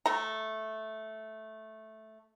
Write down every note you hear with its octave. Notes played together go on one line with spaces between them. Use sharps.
A3 A#5